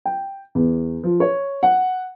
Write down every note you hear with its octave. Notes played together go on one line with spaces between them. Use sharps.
G5
E2
F3
C#5
F#5